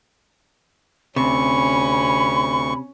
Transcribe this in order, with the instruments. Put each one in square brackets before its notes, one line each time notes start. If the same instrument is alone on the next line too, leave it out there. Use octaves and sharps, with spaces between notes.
[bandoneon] D2 C#6 [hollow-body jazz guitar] C3 [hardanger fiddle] C#4 [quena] B5